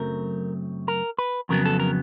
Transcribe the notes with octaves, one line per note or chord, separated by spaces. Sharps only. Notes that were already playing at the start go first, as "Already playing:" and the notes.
Already playing: F#2 C#3 F#3 A3 C4 A#4
A#4
B4
F2 C#3 F#3 B3 A#4
A4
A#4